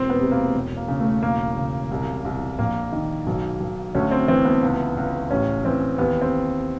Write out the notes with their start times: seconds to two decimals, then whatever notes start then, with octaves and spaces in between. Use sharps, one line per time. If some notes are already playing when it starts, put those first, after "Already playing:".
Already playing: E1 C4
0.10 B3
0.20 C3
0.31 A#3
0.55 E1
0.77 A#3
0.88 C#3
1.00 A3
1.23 E1 A#3
1.57 C#3
1.91 C2
2.25 C2
2.58 A#1 A#3
2.93 D#3
3.27 B1
3.60 B1
3.95 D2 C#4
4.11 C4
4.28 E3 C4
4.45 B3
4.62 C#2
4.97 C#2
5.31 A1 C#4
5.65 E3 C4
5.98 D#2 B3
6.21 C4